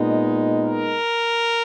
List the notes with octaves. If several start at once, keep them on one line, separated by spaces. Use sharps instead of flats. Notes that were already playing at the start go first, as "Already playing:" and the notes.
Already playing: A#2 G#3 B3 D#4
A#4